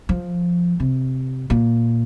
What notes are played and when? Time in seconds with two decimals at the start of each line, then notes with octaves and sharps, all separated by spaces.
0.09 F3
0.80 C3
1.50 A#2